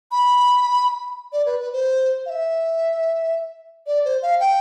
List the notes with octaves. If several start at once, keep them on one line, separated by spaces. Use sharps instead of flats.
B5
D5
B4
B4
C5
F5
E5
D5
C5
F5
G5